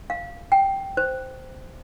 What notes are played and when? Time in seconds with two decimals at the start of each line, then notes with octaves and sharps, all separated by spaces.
0.10 F5
0.52 G5
0.97 C5